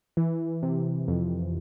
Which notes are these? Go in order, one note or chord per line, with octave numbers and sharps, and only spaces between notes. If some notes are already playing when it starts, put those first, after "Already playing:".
E3
C3
F2